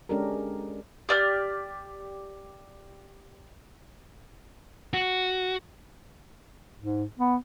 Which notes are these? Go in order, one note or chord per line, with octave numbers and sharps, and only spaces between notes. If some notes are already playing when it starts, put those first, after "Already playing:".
G#3 C#4 D4 G4 A4 A#4
G4 D5 F6
F#4
G#2
B3